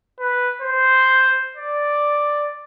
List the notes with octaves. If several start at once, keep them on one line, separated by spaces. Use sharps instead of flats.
B4
C5
D5